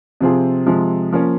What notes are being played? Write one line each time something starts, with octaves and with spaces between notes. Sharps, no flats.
C3 F3 C4 F4 G#4
C3 F3 G#3
F3 A#3 C#4